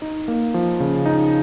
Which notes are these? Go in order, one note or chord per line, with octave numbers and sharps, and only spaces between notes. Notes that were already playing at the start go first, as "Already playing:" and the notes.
D#4
A#3
F3
C#3
D#4